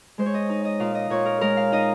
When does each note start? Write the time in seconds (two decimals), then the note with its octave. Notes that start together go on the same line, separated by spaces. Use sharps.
0.18 G#3 C5
0.26 C#5
0.34 D#5
0.49 D#4
0.65 D#5
0.80 A#2 F5
0.95 D#5
1.10 A#2 C#5
1.25 A#4
1.41 G#3 A#4
1.57 F5
1.72 D#4 D#5